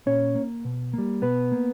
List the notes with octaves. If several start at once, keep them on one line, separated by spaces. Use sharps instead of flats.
A#2 C#4 C#5
A#3
B2
G3 A#3
B2 B3 B4
A#3